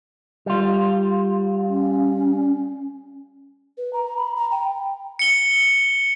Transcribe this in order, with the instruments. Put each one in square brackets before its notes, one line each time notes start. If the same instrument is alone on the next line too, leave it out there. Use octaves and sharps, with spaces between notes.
[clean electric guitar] G3 F4
[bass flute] C#4
[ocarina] B4
A#5
B5
A#5
G5
[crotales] C#7 G7